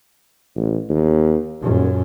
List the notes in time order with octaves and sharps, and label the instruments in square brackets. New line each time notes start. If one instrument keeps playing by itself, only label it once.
[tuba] A1
D#2
[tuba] D#1 [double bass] F#2 A#2